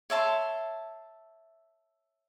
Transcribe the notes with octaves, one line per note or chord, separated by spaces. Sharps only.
C#5 E5 A5 C6